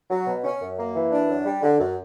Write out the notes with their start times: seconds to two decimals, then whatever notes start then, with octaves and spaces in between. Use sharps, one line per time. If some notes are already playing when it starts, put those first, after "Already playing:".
0.10 F#3
0.27 B2
0.44 C#4
0.60 F#2
0.78 A#3
0.95 E3
1.11 D4
1.28 F#2
1.45 G3
1.62 D3
1.79 F#2